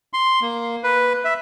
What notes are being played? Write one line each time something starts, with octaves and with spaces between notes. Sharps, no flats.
C6
A#3
B4
E5